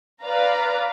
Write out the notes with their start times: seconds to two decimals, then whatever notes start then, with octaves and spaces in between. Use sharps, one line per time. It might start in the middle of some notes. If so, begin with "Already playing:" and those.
0.22 B4 D5 F5 A#5